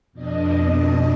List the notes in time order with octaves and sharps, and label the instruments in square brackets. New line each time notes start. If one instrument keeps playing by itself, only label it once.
[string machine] F2 B2 D4 D#5